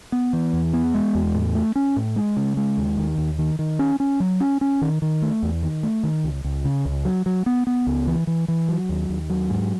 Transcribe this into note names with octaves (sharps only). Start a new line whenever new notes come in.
B3
E3
E2
B3
G#3
E2
A2
A3
C#4
A2
G#3
C#3
G#3
D#2
D#3
D#2
D#3
D#3
C#4
C#4
F#3
C#4
C#4
D#3
D#3
A3
E2
D#3
A3
D#3
C#2
C#2
C#3
C#2
F#3
F#3
B3
B3
C#2
E3
E3
E3
F#3
D#2
D#2
F#3
G#2